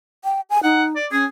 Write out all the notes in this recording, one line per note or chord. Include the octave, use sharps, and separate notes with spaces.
G5
G#5
D#4 F#5
D5
C#4 G#4